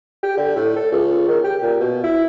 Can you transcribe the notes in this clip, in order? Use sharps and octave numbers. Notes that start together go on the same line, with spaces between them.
G4
D3
A2
A4
C#2
D#3
G4
A#2
B2
E4